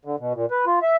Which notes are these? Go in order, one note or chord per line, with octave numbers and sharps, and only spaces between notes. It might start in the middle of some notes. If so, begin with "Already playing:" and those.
D3
B2
A#2
B4
F4
E5